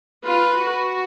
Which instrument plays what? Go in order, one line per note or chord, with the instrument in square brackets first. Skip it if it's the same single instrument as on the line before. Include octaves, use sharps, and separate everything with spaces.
[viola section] F4 [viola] B4
[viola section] F#4